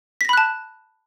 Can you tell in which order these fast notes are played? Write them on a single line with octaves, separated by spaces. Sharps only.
B6 A#6 B5 F#6 A5